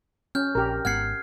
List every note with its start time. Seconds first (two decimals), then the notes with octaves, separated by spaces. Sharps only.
0.35 C#4 F6 G6
0.55 A#1 G4 A#4
0.85 G#1 B3 F#5 F6 G#6 C7